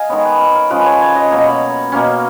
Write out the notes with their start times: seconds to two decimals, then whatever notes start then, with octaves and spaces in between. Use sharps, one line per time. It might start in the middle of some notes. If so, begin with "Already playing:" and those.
Already playing: D#5 F5 G#5
0.09 D#3 G#3 B3 C#5
0.25 B4
0.40 A#4
0.55 A#4
0.70 C#3 F3 G#3 C#4 B4
0.81 B4
0.86 C#5
1.01 C#5
1.16 D#5
1.31 B2 F#3 A#3 C#5
1.47 B5
1.92 B2 A#3 C#4